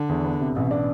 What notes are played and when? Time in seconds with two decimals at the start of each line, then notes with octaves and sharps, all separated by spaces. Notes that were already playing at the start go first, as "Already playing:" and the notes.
Already playing: D3
0.09 E2
0.24 B3
0.41 C3
0.55 A1 B2
0.71 D4